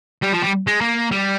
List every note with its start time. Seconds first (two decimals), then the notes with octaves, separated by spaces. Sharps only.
0.22 G3
0.33 F3
0.42 G3
0.67 G#3
0.81 A#3
1.12 G3